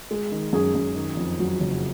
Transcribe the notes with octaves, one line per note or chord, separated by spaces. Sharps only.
G#3
D#3
F#2 G#4
F#2
D#3
F2
F#3
F#1